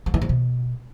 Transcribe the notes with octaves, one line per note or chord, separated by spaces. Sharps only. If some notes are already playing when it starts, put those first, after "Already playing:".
F3
E3
F3
B2